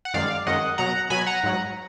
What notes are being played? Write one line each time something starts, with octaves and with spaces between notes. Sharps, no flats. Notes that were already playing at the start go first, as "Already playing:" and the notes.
F#5
F#2 D#3 G#3 D5 F5
F#2 D#3 G#3 D#5 F#5
B2 F#3 F#5 A#5
B2 F#3 G#5 B5
F#5 A#5
G#2 F#3